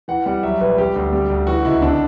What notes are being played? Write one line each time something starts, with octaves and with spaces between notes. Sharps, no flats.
E3 F#5
G3 F#5
F#3 E5
A#1 B4
G3 G4
D2
G3
D2
E3 F#4
C#2 E4
D3 D4